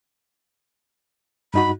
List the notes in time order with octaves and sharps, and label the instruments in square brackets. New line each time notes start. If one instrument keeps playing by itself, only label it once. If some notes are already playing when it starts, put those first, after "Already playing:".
[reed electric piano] G2 D#4 F#4 [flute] B5